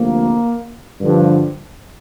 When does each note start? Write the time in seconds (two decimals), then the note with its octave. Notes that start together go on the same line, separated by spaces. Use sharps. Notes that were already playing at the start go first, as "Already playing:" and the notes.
Already playing: D2 C3 F3 A#3
1.00 G2 D3 F3